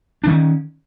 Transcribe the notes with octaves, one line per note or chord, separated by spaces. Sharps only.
D#3 C#4 D4